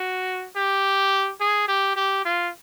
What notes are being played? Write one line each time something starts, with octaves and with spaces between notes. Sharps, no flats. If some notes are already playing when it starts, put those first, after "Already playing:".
Already playing: F#4
G4
G#4
G4
G4
F4